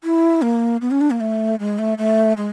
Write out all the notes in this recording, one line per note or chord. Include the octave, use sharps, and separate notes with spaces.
E4
A#3
B3
C#4
D4
A#3
A3
G#3
A3
A3
G#3